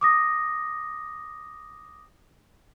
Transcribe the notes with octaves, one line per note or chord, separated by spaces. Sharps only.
D6 D#6 A#6